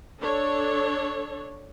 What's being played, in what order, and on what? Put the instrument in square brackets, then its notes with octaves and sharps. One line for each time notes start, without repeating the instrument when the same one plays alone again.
[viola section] D4 A4 C#5